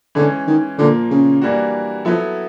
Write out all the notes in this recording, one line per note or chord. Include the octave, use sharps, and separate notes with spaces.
D3 E3 G#3 C#4
D#3
A#2 D3 F3 A#3
C#3
E3 G3 A#3 D4 F#4
F3 F#3 B3 E4 A4